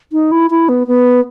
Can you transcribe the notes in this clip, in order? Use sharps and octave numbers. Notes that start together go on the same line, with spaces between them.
D#4
E4
E4
B3
B3